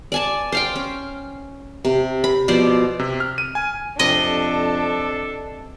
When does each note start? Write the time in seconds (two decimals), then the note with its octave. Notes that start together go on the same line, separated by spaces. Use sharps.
0.12 D5 G#5 A5
0.52 C5 F5 G5
0.76 C#4
1.85 C3
2.24 B5
2.48 B2 F3 C5 D5
2.99 C3
3.20 F6
3.38 D#7
3.55 G#5
3.99 F2 C3 D4 A4 D#5